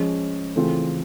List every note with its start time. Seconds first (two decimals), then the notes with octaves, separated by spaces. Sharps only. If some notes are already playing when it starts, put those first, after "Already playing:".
Already playing: F3 G#3 C#4
0.56 C#3 E3 A3 C4 F4